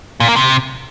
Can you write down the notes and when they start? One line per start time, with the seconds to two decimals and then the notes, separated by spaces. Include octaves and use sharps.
0.20 A#2
0.28 A#3
0.36 C3